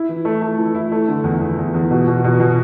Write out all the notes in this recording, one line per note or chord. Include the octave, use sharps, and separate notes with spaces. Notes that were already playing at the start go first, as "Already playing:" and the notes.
Already playing: E4
E3
A3
A3
E3
E4
A3
D3
E2
E2
E2
E2
B2
B2
B2
B2